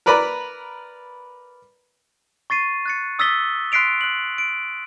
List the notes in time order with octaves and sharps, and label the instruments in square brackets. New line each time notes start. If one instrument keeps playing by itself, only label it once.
[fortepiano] A#4 B4 D5 A#5 B5
[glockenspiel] C#6 A6 C7 D#7
F#6 A6 C#7
D#6 E6 A6 B6 G7
C6 F#6 B6 C7 D7 F7
F#6 F#7
D7